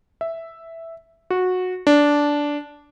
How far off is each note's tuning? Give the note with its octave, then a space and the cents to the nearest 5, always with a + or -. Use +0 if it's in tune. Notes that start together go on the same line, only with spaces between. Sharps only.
E5 +0
F#4 -15
D4 -10